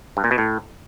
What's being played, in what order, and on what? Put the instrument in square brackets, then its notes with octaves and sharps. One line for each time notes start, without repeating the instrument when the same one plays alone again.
[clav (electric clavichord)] G2
A#2
B2
A2